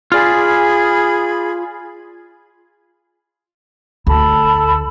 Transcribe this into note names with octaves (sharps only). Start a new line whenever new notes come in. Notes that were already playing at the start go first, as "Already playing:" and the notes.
F4 G#4 D5 B5
D2 A4 A5 B5